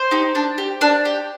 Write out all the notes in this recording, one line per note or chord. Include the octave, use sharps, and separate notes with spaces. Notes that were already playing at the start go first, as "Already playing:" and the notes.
Already playing: C5
D#4 G4
D4
G4
D4
G4